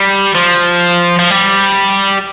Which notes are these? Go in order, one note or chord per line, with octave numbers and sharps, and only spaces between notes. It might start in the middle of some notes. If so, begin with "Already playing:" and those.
Already playing: G3
F3
F3
G3